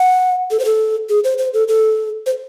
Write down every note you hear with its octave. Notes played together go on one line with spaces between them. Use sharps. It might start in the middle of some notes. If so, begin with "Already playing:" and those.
Already playing: F#5
A4
C5
A4
G#4
C5
C5
A4
A4
C5